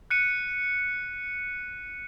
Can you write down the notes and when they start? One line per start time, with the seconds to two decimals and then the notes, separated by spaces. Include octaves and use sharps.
0.11 F#6 C#7 D#7